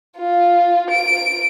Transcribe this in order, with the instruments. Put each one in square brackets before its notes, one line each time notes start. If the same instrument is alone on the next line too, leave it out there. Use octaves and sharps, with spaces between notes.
[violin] F4
D7